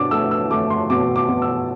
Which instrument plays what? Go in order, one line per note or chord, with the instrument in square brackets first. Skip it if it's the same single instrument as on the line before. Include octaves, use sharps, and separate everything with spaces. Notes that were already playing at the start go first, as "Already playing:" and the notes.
Already playing: [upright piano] B2 D4 D6
A3 E6
E6
A3 D6
C6
B2 D6
D6
B2
E6